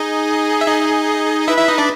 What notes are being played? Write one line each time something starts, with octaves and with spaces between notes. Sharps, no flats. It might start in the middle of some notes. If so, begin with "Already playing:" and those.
Already playing: D#4 G#4 D#5
E5
D#4 D#5
E4 B4 E5
E4 E5
D#4 D#5
D4 D5